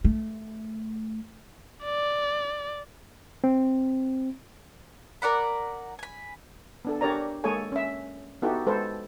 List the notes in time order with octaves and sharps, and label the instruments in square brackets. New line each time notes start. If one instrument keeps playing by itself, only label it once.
[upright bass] A3
[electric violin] D5
[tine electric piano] C4
[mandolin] A#4 D5 F#5 B5
G#5 B5
[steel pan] B3 D4 A4
D4 G4 A#4 C#5 D5 A#5
G#3 A#3 G#4 A4 C#5 G#5
C#4 E5
B3 D#4 E4 F#4 G4 A4
G#3 A4 B4 C5